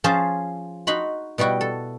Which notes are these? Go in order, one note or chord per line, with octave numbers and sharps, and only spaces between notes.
F3 C#4 F4 G#4 C5 A5
D#4 F#4 B5 C6
B2 G3 E4 F#4 G5
A4